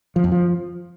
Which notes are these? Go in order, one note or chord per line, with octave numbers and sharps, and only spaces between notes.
F3
F2
F3